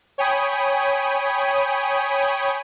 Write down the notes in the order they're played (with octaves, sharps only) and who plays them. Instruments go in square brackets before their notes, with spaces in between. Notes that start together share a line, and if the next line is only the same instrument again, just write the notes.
[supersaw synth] C#5 G5 G#5 B5 D#6